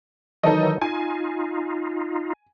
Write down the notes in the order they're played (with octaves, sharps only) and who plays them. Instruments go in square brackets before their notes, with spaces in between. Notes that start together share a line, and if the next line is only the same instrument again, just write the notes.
[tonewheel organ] D#3 E3 F#3 [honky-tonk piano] D#4 A4 D#5
[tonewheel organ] D#4 F4 [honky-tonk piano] G#5